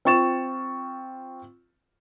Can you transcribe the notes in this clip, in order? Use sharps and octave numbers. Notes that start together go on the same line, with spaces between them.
C4 F4 C#6 A6 E7